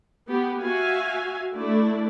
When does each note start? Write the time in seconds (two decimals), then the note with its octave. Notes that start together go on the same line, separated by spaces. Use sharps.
0.25 B3 G4
0.61 F#4 E5 F5 G#5
1.54 A3 D4 E4 D5